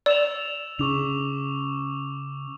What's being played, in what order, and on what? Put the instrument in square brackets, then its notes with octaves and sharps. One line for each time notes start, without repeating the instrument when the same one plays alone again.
[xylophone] D5 [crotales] E6 E7 F7
[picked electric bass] C#3 [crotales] C#6 D6 F7